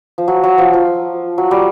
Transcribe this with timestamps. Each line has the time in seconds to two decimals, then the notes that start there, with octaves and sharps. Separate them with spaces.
0.18 F3
0.28 F#3
0.44 F#3
0.58 F3
0.73 F3
1.38 F#3
1.51 G3